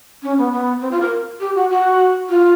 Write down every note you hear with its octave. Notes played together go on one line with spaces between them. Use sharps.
C#4
B3
B3
C4
F4
A#4
G4
F#4
F#4
F4